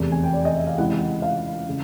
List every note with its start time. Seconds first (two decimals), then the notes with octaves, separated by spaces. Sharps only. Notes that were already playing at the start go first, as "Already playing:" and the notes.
Already playing: F1 E2 C3
0.12 G#5
0.24 G5
0.33 D5
0.45 D#5
0.56 E5
0.67 F5
0.78 C#2 C3 E3 F#5
1.22 F5
1.69 C#3